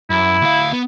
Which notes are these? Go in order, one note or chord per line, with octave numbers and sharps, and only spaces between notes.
F#2 E4
D2 F5
B3